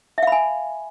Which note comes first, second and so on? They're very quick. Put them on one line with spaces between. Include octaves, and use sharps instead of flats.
E5 F5 B5 G#5